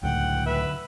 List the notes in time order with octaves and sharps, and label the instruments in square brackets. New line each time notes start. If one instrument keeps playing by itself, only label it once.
[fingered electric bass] C#2 A2 [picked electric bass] D3 E3 F#3 [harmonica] F#5 G5
[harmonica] B4 E5